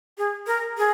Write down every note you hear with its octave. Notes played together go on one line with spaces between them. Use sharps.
G#4
A#4
G#4